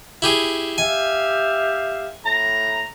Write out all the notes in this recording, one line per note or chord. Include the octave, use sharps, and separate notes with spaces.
E4 G4 G#4
G4 E5 F5 G#5
A2 A#5